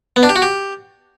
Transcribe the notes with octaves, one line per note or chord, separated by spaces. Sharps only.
B3
D4
G4
F#4
G4